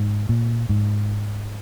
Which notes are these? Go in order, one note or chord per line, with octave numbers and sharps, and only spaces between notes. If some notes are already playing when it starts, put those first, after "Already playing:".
Already playing: G#2
A#2
G#2